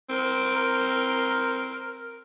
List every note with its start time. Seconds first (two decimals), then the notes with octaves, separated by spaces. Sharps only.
0.09 C4 A#4